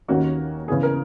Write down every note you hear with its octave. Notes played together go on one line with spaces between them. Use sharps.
D#2 D#3 A#3 C#4 F#4
C#3 E3 B3 G#4
A#4